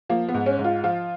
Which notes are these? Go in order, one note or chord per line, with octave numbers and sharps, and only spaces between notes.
F3 A#3
B3
G#2
C#4
G#2
F4
F3 F4